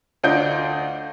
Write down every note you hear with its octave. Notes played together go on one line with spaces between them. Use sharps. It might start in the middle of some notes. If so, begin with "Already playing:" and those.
D2 D4 F4 D#5 G6 D7